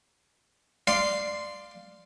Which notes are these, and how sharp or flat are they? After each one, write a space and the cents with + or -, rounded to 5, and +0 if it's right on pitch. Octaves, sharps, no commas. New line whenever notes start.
D5 +10 F5 +0 C6 -10